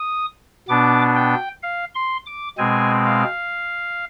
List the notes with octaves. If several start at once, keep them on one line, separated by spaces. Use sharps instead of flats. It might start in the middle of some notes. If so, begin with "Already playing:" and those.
Already playing: D#6
B2 B3 D4 D6
G5
F5
C6
D6
B2 G#3 C4 G#5
F5